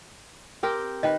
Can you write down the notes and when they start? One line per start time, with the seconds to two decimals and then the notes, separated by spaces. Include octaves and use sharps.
0.63 C4 G4 A#4
1.03 D#3 B4 D#5 G5